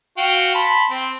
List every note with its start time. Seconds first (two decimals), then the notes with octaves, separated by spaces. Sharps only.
0.18 F#4 F5 G5
0.55 A5 B5 C6
0.90 C4